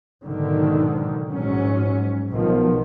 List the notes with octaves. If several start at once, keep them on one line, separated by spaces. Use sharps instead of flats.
B1 G#2 D3 D#3
A#1 G#2 F#3 C#4
B1 B2 D#3 F3